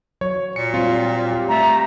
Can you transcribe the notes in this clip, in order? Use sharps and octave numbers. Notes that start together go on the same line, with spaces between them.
F#3 C#5
A#2 C#7
G3 C4 F4
G4
A3 A#5